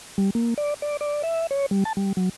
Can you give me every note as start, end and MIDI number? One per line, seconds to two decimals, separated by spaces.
0.18 0.30 55
0.35 0.54 58
0.58 0.74 74
0.82 0.97 74
1.01 1.22 74
1.23 1.47 76
1.51 1.66 73
1.71 1.84 55
1.85 1.93 81
1.97 2.13 55
2.17 2.29 54